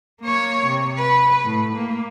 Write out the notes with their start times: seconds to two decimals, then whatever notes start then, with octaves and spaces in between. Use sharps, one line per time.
0.21 A#3 C#5
0.66 C3
0.98 B4
1.44 A2
1.76 A#3